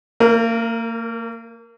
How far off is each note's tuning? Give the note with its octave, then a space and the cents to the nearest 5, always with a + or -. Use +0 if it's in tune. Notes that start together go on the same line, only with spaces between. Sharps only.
A#3 -35 A#4 +0